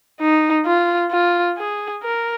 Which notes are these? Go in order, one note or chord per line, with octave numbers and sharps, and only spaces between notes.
D#4
F4
F4
G#4
A#4